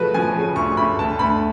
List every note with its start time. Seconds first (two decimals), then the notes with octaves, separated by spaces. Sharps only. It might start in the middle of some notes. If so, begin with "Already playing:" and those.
Already playing: C#3 F3 A3 F#4 B4
0.14 F3 G#5
0.36 C#3
0.56 D2 C#6
0.77 D2 B5
0.99 D2 A5
1.19 D2 B5